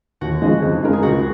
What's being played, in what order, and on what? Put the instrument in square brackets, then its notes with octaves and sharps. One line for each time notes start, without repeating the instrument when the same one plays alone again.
[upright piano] D#2 [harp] F#4
[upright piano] C#3 F3 G#3 D#4
F2
C#3 G#3 D#4 A#4
[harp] G#4
[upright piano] C#2 [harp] F#4